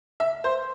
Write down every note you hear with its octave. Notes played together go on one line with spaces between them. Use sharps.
E5
C5